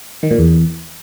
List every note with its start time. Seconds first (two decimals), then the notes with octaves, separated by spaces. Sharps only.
0.23 D#3
0.31 A#2
0.38 E2